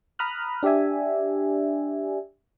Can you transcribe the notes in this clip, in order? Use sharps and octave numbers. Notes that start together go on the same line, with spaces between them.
A#5 B5 D#6 F6 F#6
D4 G4 D5 E5 G#5